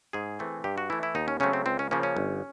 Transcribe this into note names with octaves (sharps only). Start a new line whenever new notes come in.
G#2 G#4
E3 A3 C4
G2 G4
F#4
E3 A3 E4
E4
D#2 D#4
C#4
C#3 F#3 A3 C4 C#4
C4
C#2 C4
C#4
C#3 F3 A#3 C#4
C#4
G1